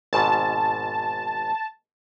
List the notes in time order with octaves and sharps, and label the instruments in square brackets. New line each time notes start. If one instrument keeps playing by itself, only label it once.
[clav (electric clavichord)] G#1 G#2 B2 [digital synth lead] A5